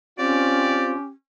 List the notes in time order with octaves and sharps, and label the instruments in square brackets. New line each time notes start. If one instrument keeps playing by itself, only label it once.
[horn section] C4 F4 [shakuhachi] C#4 [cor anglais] G4 [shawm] D5